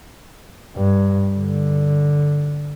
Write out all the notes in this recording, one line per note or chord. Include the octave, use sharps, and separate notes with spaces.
G2
D3